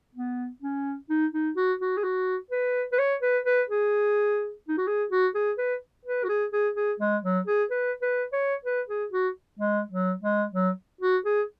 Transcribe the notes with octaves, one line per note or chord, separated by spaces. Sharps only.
B3
C#4
D#4
D#4
F#4
F#4
G#4
F#4
B4
B4
C#5
B4
B4
G#4
D#4
F#4
G#4
F#4
G#4
B4
B4
F#4
G#4
G#4
G#4
G#3
F#3
G#4
B4
B4
C#5
B4
G#4
F#4
G#3
F#3
G#3
F#3
F#4
G#4